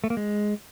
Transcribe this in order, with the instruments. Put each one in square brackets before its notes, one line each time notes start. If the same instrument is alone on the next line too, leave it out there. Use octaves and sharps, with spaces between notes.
[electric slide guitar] A3
A#3
G#3